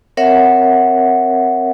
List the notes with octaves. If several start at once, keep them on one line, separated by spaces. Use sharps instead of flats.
C4 A#4 C#5 E5 F#5